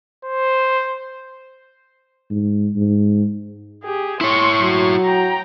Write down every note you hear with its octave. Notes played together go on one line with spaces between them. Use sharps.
C5
G#2
G#2
G4 G#4
E4 C#5 C6 C#6
F#3
G5 A#5